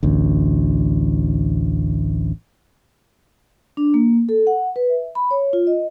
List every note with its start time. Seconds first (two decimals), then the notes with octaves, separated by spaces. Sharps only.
0.03 A1 D2
3.77 D4
3.94 A#3
4.29 A4
4.47 F#5
4.76 B4
4.89 E5
5.15 B5
5.31 C#5
5.53 F4
5.67 D#5